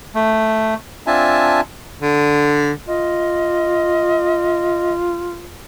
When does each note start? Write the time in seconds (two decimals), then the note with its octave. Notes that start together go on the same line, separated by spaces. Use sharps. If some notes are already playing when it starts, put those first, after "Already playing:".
0.15 A3
1.07 C4 D4 F4 E5 G#5 A5
2.00 D3
2.88 F4 D#5